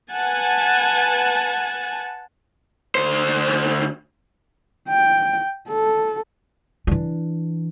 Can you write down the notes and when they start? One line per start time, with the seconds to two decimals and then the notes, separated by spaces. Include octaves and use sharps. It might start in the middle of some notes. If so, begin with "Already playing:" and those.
0.11 B4 F#5 G#5 A5
2.95 D2 C5
4.89 G5
5.69 A4
6.87 E3 D4